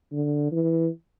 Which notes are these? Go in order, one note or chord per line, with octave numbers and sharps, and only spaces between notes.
D3
E3